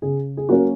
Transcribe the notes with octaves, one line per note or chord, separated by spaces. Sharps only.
C#3 G#4
G#4
F#3 A#3 C#4 F#4 A#4